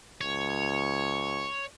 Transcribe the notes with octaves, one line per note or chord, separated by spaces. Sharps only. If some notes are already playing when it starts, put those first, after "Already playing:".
C#2 C#5